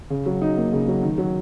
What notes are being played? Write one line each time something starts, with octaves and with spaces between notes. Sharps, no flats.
C#3
F#3
D#4
A#3
C#3
F#3
D#3
F#3